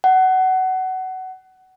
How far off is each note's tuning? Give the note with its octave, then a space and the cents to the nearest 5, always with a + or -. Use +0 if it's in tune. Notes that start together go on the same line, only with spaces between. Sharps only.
F#5 +20